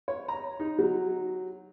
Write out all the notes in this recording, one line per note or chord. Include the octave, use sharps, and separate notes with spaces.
C#5
A#5
D#4
F#3